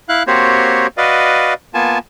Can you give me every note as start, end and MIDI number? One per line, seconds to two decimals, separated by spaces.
0.09 0.23 64
0.09 0.23 77
0.09 0.23 90
0.27 0.87 58
0.27 0.87 60
0.27 0.87 66
0.27 0.87 67
0.27 0.87 72
0.27 0.87 73
0.98 1.54 66
0.98 1.54 71
0.98 1.54 74
0.98 1.54 75
0.98 1.54 77
1.74 1.99 58
1.74 1.99 59
1.74 1.99 65
1.74 1.99 80
1.74 1.99 81